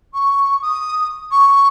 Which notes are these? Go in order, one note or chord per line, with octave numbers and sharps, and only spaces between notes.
C#6
D#6
C#6